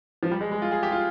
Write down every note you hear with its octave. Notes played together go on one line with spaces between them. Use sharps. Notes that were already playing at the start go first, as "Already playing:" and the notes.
F3
G3
G#3
G#3
F4
G#4
G4
F4